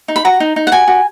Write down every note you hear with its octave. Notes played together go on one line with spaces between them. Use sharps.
D#4
B5
F#4 A#5
D#4
D#4
F#5
F#4 G#5
F#4